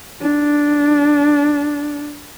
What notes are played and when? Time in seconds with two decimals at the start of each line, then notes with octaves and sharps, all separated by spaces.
0.22 D4